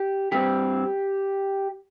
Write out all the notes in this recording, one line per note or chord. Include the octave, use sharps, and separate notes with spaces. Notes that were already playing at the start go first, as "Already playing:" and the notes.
Already playing: G4
G2 G3 C4 G4